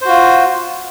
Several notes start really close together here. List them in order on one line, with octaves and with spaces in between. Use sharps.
C5 F#4 F4